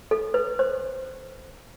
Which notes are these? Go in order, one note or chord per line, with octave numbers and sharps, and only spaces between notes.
A4
B4
C5